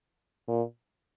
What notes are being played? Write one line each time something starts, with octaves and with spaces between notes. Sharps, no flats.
A#2